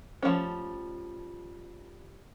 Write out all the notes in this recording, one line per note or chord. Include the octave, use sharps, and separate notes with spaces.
F3 G3 A3 C#4